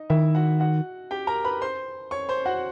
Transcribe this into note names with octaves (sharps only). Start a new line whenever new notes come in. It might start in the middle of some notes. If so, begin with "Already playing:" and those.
Already playing: D#4 D#5
D#3 E4 E5
F#4 F#5
F#4 F#5
G4 G5
A#4 A#5
B4 B5
C5 C6
C#5 C#6
C5 C6
F#4 F#5